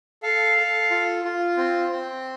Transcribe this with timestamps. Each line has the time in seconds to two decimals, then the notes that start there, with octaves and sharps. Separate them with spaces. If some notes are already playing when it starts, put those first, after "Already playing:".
0.23 A4 F5
0.57 A4
0.91 F4
1.24 F4
1.57 C4
1.91 C4